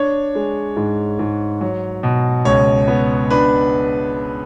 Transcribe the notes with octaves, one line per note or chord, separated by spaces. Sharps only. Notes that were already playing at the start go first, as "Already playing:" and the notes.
Already playing: D4 C#5
G#3
G#2
G#2
F#3
B2
C#2 C#5
B3
D4 B4